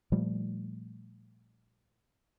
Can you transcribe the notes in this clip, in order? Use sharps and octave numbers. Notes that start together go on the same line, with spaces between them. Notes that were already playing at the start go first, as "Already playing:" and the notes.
A#2 F3 G3 A3